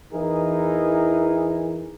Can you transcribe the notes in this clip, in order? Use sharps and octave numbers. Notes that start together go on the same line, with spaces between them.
E2 E3 D#4 E4 G#4 A#4